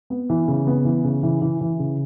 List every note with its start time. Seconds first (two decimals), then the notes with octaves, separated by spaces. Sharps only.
0.10 B3
0.30 E3
0.48 C#3
0.67 B3
0.85 E3
1.04 C#3
1.23 E3
1.42 E3
1.61 E3
1.79 C#3